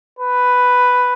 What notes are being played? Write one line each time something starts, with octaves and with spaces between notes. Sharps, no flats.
B4